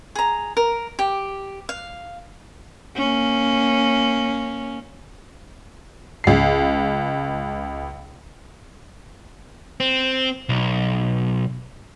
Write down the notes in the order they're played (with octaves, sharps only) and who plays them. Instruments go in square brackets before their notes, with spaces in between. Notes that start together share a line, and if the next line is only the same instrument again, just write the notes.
[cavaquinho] G#4 A#5
A#4
G4
F5
[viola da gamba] A#3 C#4
[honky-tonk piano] C#2 C7
[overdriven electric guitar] C4
B1